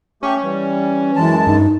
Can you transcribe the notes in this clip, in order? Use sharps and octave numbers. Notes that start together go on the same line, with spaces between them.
A3 C#4 G4 C#6
E3 G3
F#2 E3 G#3 A5
G2 D#4